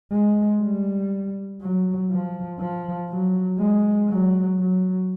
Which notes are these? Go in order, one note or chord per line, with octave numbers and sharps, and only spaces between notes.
G#3
G3
F#3
F3
F3
F#3
G#3
F#3
F#3